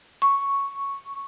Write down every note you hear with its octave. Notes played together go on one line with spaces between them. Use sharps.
C#6